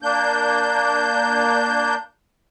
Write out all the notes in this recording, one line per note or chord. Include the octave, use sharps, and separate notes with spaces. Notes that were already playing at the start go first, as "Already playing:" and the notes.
A#3 D4 G6